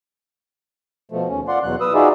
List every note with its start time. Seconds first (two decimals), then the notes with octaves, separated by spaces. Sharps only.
1.11 B2 F3 A3
1.29 D#2 C#4
1.48 F4 D5 F#5 C6
1.63 E2 B2 F#3 F#6
1.81 B4 D#6 E6
1.94 D#4 F4 F#4 G#4 D5 E5